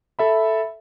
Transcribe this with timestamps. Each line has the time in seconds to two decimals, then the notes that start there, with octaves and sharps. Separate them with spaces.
0.19 A4 E5 B5